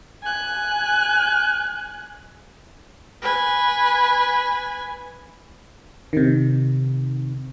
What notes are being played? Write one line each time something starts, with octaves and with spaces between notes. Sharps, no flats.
G#5 F#6
B4 G#5
C3 D#3